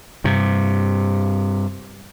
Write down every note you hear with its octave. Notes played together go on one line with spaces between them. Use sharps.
G2 C3